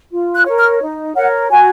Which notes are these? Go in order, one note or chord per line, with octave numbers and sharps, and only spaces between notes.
F4
F#6
A#4 C#5
F6
D#4
A#4 C#5 F#5
F#4 G#5